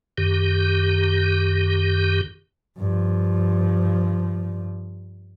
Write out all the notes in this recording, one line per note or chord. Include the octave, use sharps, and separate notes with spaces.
F#2 D#3 G4
G2 F3